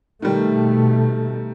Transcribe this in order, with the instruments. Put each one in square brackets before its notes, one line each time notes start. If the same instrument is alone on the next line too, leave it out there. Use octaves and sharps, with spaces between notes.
[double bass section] B2 A3 [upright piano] D#3 G3